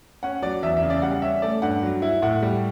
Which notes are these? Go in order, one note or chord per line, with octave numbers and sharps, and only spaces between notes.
C#4 F#5
F#3 D5
E2 E5
E5
C#3
D5
G3 F#5
C#4 E5
A3 D5
G2 F#5
F#3
E4
A2 F#5
G3